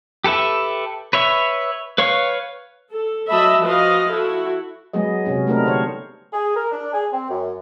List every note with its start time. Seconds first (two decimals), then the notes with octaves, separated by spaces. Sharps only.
0.24 G4 A4 B4 E5
1.13 B4 C#5 E5
1.98 B4 C#5 F5 C#6
2.91 A4
3.30 F#3 D#5 E5 A5 B5
3.62 F3 F#4 B4 D#5 F5
4.09 E4 F#4 A4
4.93 F#3 G#3 B3 G#4 D#5
5.25 C3 B3 C#4 F#4
5.47 A3 B3 C4 D4 D#4 A#4
5.64 D3 C5 C#5
6.33 G#4
6.57 A#4
6.72 D4
6.94 G#4
7.13 C4
7.30 F#2